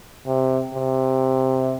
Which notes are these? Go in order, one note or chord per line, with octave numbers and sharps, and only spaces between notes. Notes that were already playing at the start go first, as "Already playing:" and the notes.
C3
C3